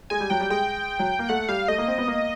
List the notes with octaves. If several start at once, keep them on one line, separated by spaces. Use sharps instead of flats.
G#3 G#5
G3
F#3 G5
G3
G#3 G5
F#3
A#3
A3 F#5
G3 F5
A3 D#5
A#3
C4
B3
A#3